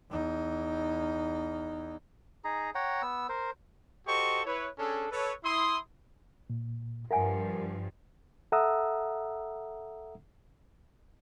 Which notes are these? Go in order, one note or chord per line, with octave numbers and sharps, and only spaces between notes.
E2 D#4
D#4 G#4 A#5
C#5 F#5 G5 A#5
B3 E6
A#4 C5
F#4 G4 A4 C5 D#5 C#6
E4 B4 C#5
C#4 D4 G#4 A4
A4 B4 C#5
E4 C6 D#6
A#2
G2 F3 A#4 E5 F#5 G#5
A4 E5 F#5 A#5 D#6 E6